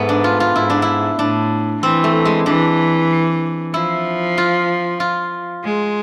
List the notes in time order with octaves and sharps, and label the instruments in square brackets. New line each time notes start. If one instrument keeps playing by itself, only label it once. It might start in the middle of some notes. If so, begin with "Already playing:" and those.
Already playing: [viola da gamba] G#2 [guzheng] A3 B3
[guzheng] D4
F4
F4
[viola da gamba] G#2 [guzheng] E4
[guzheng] D4
E4
[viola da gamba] A2 [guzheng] D4
[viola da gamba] E3 [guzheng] C4
[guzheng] A3
G#3
[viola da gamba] E3 [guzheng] D4
[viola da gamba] F3 [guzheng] E4
[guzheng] F4
F4
[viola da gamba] G#3